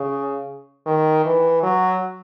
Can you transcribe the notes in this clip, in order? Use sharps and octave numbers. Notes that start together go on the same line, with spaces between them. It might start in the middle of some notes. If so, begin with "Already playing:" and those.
Already playing: C#3
D#3
E3
F#3